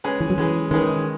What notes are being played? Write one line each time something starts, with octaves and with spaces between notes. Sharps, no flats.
G#3 C#4 G#4 B4
E3
F#3
E3 G#3 C#4 G#4 B4
D#3 G#3 C#4 G#4 B4